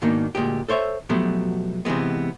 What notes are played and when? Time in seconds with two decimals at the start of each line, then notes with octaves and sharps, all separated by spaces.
0.02 G#2 B2 D#3 A#3 D4 D#4
0.35 D2 A#2 G#3 G4
0.69 A4 C5 C#5 E5
1.09 B2 F3 F#3 A3 B3 G4
1.85 C3 E3 F3 G#3 B3